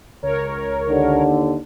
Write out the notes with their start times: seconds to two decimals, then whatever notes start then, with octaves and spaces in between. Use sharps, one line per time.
0.22 C#2 A#4 C#5
0.90 D#2 D3